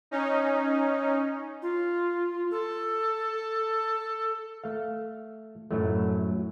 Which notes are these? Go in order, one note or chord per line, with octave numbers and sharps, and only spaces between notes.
C#4 D#4
F4
A4
A3 F5
F#2 A2 F#3 A3